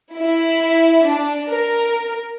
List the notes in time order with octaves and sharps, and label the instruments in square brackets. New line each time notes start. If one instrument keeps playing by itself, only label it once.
[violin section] E4
D4
A#4